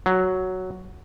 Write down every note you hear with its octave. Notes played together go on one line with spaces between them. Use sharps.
F#3